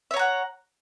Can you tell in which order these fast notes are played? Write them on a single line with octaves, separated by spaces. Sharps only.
E5 C#5 A#5 F#5